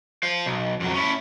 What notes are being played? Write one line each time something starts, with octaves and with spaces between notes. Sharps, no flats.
C5 F5
B1
F2 F#3
C#4 E4